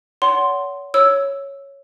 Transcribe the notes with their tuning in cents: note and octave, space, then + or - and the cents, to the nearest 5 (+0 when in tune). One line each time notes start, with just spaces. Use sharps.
C#5 +35 F#5 +15 C6 +0
C#5 +0 E6 +0